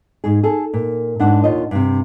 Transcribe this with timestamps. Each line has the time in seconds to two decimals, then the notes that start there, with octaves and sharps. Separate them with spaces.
0.24 G#2 G#4
0.43 G#4 A4
0.74 A#2
1.20 G#2 D4 F#5
1.44 D#2 A#2 D#4 F4 C#5 D#5
1.71 G2 C3